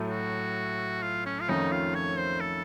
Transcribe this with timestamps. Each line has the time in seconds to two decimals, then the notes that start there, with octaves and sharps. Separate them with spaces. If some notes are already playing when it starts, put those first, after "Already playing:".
Already playing: A2 F#3 A3
0.10 F#4
1.02 F4
1.26 C#4
1.41 F4
1.48 F2 D#3 A3 C#4 D#4
1.72 F4
1.95 C#5
2.18 C5
2.41 A4